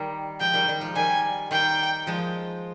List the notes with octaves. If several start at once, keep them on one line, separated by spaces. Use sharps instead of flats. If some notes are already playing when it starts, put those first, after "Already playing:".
Already playing: D#3 G3
F3 G#3 G5
D#3 G3
D#3 G3
F3 G#3
D#3 G3 G#5
D#3 G3 G5
F3 G#3